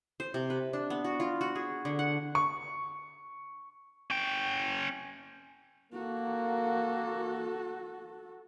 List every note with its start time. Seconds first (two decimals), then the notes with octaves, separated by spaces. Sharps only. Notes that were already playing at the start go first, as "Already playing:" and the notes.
0.20 C5
0.34 C3
0.50 B4
0.73 D4
0.90 B3
1.04 F#4
1.20 F4
1.41 F#4
1.56 G#4
1.85 D3
1.99 F#5
2.35 C#6
4.10 C#4 G5
5.93 A#3 F#4 A4